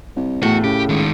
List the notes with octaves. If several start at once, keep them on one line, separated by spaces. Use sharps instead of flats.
C2
E2 A2 F#4
C#3 G4
D#3 G#3